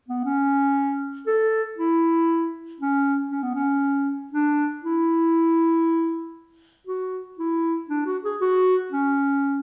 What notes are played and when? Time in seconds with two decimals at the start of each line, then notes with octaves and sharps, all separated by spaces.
0.09 B3
0.25 C#4
1.27 A4
1.78 E4
2.80 C#4
3.31 C#4
3.43 B3
3.55 C#4
4.33 D4
4.84 E4
6.87 F#4
7.39 E4
7.90 D4
8.06 F#4
8.24 G#4
8.41 F#4
8.92 C#4